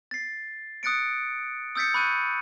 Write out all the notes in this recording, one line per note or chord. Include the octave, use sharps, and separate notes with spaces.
A6 C7
D#6 F#6 A6 C#7 D7
D#6 E6 G6 A6 B6 C#7
B5 C#6 F#6 G6 D#7